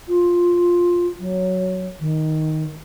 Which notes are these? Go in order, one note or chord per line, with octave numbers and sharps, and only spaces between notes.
F4
F#3
D#3